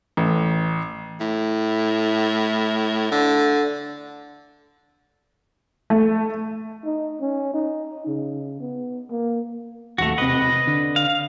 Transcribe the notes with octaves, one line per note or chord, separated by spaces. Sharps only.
A1
A2
D3
A3
D#4
C#4
D#4
C#3
B3
A#3
D1 D#2 A3 F#4
E1 C3 B4 D#5
D3
F5